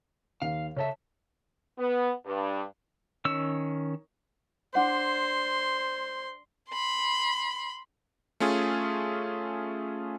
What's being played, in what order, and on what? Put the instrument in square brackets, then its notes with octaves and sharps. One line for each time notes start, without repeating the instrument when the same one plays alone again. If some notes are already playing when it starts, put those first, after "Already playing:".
[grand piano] D#2 [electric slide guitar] F5
[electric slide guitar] C#3 A4 E5 [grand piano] C#5 A5
[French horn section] B3
G2
[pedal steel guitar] D#3 C#4 E6
[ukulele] D4 F#5 [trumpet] C5 [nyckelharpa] C6
[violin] B5 C6
[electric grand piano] A3 C#4 F4 G#4